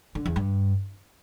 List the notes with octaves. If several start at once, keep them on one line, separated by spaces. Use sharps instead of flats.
D3
E2
G2